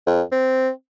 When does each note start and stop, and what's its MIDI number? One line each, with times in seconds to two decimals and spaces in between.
0.07 0.22 41
0.31 0.69 60